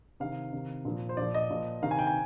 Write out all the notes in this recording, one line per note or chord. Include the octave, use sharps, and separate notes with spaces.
C3 D#3 F5
C3 D#3
A#2 F3
C5
A#2 F3 D5
D#5
A#2 F3
C3 D#3 F5
G#5
G5
G#5